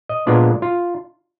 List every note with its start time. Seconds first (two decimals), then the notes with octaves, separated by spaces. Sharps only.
0.09 D#5
0.27 A#2 G#3 B3 D4 F4 D5
0.62 F4